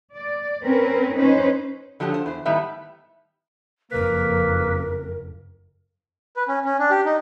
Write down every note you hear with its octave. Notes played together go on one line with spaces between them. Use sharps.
D5
C4 C#4 A#4 B4
C#4 D#4 B4 C5
D3 F3 F#3 D4 G4
F4 C5
E2 C5
A2 D#3 G3 B3 E5
F#1 F2 A#3 A#4 B4
B4
C#4
C#4
D4
G4
D#4